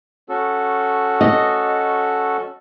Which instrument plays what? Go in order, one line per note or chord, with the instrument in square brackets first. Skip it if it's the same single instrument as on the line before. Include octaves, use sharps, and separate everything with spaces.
[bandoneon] C#4 F#4 A4
[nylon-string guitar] D#5